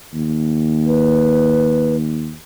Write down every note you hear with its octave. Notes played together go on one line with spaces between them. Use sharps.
D#2
B4